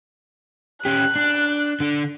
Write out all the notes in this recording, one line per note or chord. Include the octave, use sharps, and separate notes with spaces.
C#4 G4 F#6
D4
D3 D4